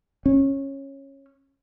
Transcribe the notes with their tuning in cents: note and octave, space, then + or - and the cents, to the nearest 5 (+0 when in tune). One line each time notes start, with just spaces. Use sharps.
C#4 -15